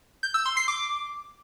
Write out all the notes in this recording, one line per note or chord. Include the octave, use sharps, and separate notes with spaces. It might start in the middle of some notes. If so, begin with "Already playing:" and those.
G6
E6
C6
C7
D6